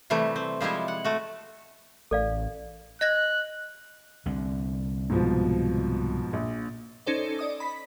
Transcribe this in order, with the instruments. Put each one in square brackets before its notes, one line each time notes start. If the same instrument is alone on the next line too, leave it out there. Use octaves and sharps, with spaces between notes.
[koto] C3 E3 G3 A3
C4
F3 G3 G#3 E4 C5
F#5
A3 F#4
[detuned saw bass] A1 [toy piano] A4 D5 F5
[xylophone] D#5 G#6 A#6 [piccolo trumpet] F#6
[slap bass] C2 D3
[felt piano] G#2 B2 F3
A#1
[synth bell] C#4 D#4 A4 C5 D5
D5 D#5 D#6
B5 B6